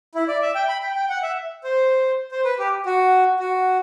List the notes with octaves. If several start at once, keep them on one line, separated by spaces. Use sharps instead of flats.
E4
D5
E5
G5
B5
G5
G5
F#5
E5
C5
C5
B4
G4
F#4
F#4